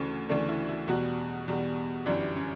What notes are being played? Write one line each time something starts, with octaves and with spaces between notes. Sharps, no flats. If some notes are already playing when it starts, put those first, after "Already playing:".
Already playing: D2 C#3 E3 A3 C#4
D2 C#3 E3 A3 D4
E4
E4
E2 B2 G3 F#4
E2 B2 G3
G1 F#2 E3 G3 D4
C#4